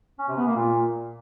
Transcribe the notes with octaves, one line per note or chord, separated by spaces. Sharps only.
C#4
C3
B3
A#3
A#2